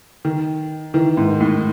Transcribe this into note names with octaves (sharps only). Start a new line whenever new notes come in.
D#3
D#3 E3
G#2
D#3
A2